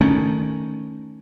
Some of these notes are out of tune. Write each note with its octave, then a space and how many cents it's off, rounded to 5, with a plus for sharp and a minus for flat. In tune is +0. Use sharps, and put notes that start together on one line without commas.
D#3 +0 A3 +0 C#4 -5